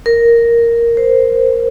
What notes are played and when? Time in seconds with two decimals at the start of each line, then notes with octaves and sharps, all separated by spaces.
0.06 A#4
0.97 C5